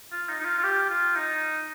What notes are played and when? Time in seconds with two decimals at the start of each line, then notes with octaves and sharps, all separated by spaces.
0.11 F4
0.29 D#4
0.40 D#4
0.45 F4
0.58 F4
0.63 G4
0.90 F4
1.16 D#4